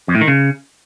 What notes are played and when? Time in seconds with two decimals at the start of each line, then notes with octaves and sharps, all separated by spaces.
0.08 F2
0.15 A2
0.21 D#3
0.28 C#3